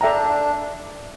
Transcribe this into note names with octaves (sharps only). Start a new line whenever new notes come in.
D4 A4 E5 G5 A#5